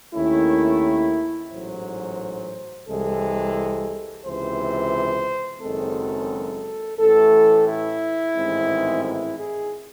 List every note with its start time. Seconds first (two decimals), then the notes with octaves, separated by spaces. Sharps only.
0.14 D#2 D#3 A3 C#4 E4
1.51 A1 G#2 F#3 C5
2.87 C2 C3 E3 G#3 A4
4.25 C#2 C3 E3 C5
5.61 F#1 F#2 D#3 G#3 C4 A4
6.98 A1 A2 E3 A3 A4
7.67 E4
8.36 A1 G#2 D#3 G#3 C4
9.04 E4
9.38 G#4